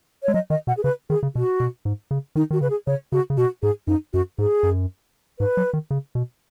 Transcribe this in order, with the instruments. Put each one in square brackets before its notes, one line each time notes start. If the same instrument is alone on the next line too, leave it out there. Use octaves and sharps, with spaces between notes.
[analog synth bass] G#3 [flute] C#5
[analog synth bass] F#3 [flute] D#5
[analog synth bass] D#3 [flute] D#5
[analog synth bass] B2 [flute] F#5
[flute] G#4
[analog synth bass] C#3 [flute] B4
[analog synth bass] D#3 [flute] G#4
[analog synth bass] C#3
[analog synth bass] B2 [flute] F#4
[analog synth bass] B2
G#2
C#3
[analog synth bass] D#3 [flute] D#4
[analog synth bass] D#3 [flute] F#4
[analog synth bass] C#3 [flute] B4
[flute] G#4
[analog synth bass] C#3 [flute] C#5
[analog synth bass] C#3 [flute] F#4
[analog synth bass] C#3
[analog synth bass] B2 [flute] F#4
[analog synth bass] G#2 [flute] G#4
[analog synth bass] F#2 [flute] D#4
[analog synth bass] F#2 [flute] F#4
[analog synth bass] G#2 [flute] G#4
[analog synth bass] F#2
[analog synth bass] G#2 [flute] B4
[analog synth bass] F#3
D#3
C#3
B2